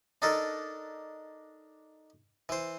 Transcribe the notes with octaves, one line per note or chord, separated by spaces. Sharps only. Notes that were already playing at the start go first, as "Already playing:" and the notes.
D4 D#4 A4 A#4
E3 C5